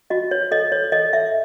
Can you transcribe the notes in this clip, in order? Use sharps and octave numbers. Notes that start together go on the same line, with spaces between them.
F#4 D#5
C#5
A4 D#5
C#5
A4 D#5
E5